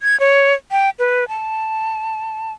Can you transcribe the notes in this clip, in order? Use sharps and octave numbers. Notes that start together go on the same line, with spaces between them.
G#6
C#5
G5
B4
A5